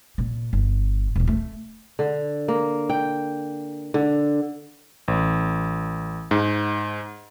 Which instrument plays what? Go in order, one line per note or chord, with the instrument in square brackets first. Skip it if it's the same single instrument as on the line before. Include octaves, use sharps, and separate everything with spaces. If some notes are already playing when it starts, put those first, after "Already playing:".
[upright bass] A#2
G1
E1 A#2
A3
[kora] D3
A#3
G5
D3
[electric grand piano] A1
G#2